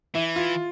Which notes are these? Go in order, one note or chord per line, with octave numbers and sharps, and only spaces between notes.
E3 E4
F4